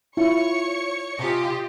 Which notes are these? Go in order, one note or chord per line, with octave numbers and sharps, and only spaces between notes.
E4 F4 C#5 C#6 C#7
C3 F4 G4 D#5 G#5